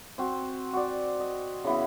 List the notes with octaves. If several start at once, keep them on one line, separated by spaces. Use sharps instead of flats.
C4 F#4
F#4 D5
D#5
C#3 E3 B3